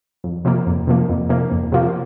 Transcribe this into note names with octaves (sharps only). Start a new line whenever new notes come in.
F2
C3 F3 A#3
F2
C3 F3 A#3
F2
C3 F3 A#3
F2
C3 F3 A#3